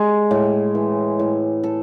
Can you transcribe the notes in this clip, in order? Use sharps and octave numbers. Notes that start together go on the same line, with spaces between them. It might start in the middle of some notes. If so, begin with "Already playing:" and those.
Already playing: G#3
A2
E3
A2
A4